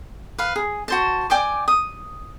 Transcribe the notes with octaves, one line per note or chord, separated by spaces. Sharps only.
B4 F5
G#4
F#4 C5 A5
D5 G5 G#5 D6
D#6